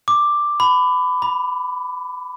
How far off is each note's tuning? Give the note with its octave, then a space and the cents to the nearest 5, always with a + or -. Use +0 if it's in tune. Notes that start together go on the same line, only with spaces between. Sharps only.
D6 +5
B5 +25
B5 -20